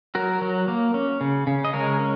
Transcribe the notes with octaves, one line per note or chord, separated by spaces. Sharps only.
F#3 F#4 A#4
F#3
A#3
C#4
C#3
C#3
D#5
G#3 A#4 C#5
C#4